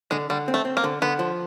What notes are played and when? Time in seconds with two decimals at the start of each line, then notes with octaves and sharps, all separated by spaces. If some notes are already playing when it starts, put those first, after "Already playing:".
0.11 D3 G#3
0.30 D3 G3
0.48 C4
0.54 A3
0.65 C4
0.77 A#3
0.84 D3
1.02 D3 B3
1.19 F3